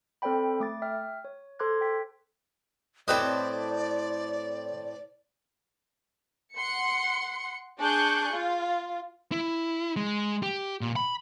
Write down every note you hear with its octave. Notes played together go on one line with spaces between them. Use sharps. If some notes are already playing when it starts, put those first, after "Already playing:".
C4 A4 C5 D5 G5 B5
A3 D6 A6
E5 G5 F6
C#5
A4 C5 C6 D6 F#6 G#6
G5 B6
A2 C4 G4 B4 C5 D5 D#5
F#5 C6 C#7
D4 G#4 G#5 C#6 F#6 G6
F4
E4
G#3
G4
A#2
B5